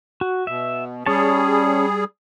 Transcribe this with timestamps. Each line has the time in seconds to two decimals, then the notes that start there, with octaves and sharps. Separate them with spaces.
0.21 F#4
0.47 B2 E5
1.06 G3 C#4 G#4 C#5 A5